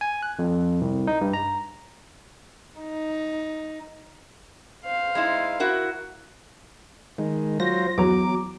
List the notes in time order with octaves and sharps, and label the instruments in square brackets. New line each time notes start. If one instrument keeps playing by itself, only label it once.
[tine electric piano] G#5
F#6
F2
C2
D#4
G2
A#5
[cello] D#4
[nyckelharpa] C5 F5
[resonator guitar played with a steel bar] G#3 D#4 E4
E4 F#4 A#4
[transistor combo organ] D#3 G#3
[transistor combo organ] F#3 F4 C5 [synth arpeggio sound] A#6
[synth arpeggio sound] E2 F#3 A#5 [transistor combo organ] D6